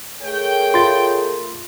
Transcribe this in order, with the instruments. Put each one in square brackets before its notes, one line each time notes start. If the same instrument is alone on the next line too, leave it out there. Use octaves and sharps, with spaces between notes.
[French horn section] A3 G#4 A#4 [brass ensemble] C#5 G5
[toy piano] F4 D5 F5 [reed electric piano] C6 A6